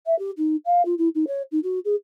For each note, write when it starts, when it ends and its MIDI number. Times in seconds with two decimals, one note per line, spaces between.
0.06 0.18 76
0.19 0.31 67
0.38 0.56 63
0.66 0.85 77
0.85 0.95 65
0.98 1.09 64
1.15 1.25 63
1.28 1.42 73
1.52 1.60 63
1.63 1.79 66
1.85 1.95 68